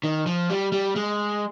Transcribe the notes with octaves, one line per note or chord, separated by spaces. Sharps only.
D#3
F3
G3
G3
G#3